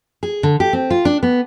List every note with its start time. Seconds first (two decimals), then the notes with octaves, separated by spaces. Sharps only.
0.23 G#4
0.43 D3
0.60 G4
0.73 C4
0.90 F4
1.05 D4
1.23 B3